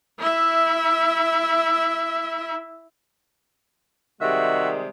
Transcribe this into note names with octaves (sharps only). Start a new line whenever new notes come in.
E4 E5
C3 D#3 G3 G#3 F#4 E5